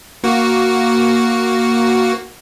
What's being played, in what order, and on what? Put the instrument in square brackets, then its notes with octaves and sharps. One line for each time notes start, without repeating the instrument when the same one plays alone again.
[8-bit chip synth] A#3 F#4